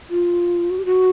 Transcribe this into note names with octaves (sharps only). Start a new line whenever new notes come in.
F4
F#4
G4
F#4